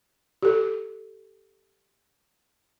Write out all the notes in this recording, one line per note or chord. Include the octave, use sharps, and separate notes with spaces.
G4 A4